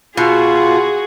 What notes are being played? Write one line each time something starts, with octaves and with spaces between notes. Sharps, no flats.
B2 F4 F#4 G#4